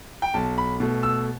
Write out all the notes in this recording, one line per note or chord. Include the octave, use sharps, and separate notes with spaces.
G5
B1 A5
B5
B2 A3
E6